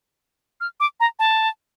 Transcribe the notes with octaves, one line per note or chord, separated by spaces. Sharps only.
F6
D6
A#5
A5